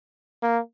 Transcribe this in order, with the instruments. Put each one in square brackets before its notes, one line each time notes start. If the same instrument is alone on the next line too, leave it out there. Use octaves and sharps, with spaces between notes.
[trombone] A#3